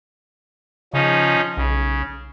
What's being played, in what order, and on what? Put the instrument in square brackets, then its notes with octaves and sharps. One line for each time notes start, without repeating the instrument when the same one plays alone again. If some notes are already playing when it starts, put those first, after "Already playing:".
[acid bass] C#3 [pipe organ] F3 C#4 D#4
[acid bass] B1 [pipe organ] C#3